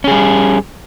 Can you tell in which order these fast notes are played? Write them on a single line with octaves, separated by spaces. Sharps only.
C#4 G#4 G3